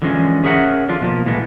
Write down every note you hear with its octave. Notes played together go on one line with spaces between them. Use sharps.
D3 E3 F3 G#3 C4 C#4
C#4 G#4 A#4 E5 F#5
D3 F3 D4 F4
B2 F3 A#3
A#2 E3 G#3 A3 B3